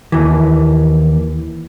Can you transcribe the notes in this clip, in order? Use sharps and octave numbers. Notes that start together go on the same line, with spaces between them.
D#2 E3